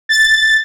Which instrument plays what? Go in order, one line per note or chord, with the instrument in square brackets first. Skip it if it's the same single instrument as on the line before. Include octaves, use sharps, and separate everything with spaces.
[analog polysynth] A6